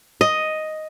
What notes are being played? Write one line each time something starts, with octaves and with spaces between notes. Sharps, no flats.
D#5